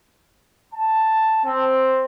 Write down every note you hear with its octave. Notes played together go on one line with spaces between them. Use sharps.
A5
C4